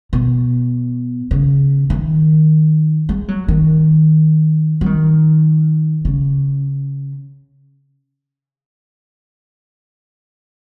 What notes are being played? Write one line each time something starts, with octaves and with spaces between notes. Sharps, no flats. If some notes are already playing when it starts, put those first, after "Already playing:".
B2
C#3
D#3
G#3
F#3
D#3
F#3
D#3
C#3